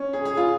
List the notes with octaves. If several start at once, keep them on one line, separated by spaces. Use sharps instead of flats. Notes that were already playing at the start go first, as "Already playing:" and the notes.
Already playing: C#4
G#4
G#4
F4